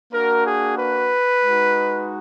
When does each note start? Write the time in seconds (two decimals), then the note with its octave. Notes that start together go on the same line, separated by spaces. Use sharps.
0.13 A#3 D4 F#4 A#4
0.45 G#4
0.78 B4
1.44 G#3 D#4 F#4